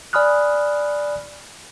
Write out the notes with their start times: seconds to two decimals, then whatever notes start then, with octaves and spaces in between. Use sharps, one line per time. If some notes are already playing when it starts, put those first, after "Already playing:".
0.13 D5 G#5 B5 D#6 F6 F#6